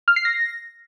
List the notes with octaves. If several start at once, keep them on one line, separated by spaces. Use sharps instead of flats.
F6
C7
A#6